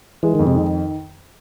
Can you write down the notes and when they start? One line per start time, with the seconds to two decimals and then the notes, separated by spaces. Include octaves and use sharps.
0.23 E3 G#3
0.35 F2 D#3
0.47 C3
0.55 D#3